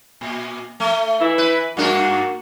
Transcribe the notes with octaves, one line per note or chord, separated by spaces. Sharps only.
A#2
A3
E3 E4
B4
G2 A#3 D4 F#4 A#4